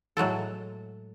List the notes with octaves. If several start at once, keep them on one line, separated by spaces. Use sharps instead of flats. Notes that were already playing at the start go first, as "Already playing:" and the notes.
A2 F#3 G#3 A4